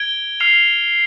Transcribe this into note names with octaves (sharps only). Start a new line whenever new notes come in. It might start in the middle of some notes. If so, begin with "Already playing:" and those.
Already playing: G#6 D7 G7
F6 C7 F7